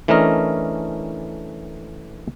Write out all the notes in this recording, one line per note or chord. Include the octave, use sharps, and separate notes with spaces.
E3 A3 C#4 D4 A#4 D#5